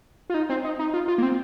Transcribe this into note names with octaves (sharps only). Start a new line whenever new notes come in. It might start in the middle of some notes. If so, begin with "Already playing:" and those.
F4
D#4
C4
D#4
D#4
F4
F4
A#3
C4